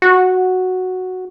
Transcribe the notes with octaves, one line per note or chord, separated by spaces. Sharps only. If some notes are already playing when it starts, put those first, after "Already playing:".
F#4